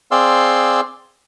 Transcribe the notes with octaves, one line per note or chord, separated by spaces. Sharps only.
C4 G#4 D5 F5 C6 E6